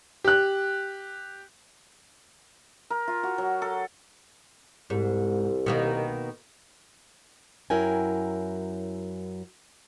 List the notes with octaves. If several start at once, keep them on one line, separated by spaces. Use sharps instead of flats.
G4 F#6
A#4
F4
F#4
F#3
A4
C2 G#2
B2 D#3 A#3
F#2 F#3 E4 A#4 G5 G#5